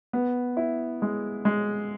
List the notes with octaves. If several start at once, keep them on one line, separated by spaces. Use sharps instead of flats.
B3
E4
G#3
G#3